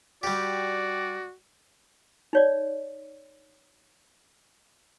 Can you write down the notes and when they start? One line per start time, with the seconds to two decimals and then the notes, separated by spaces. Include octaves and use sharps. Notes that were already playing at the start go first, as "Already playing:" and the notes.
0.23 G3 F#4 G4 D5
2.33 D#4 C#5 D5